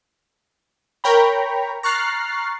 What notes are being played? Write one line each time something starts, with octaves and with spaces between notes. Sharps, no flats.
A#4 C#5 G5 A#5 B5
A#5 C#6 F6 F#6 A6 C7